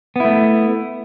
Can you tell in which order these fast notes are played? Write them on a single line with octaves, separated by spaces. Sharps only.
B3 E4 A3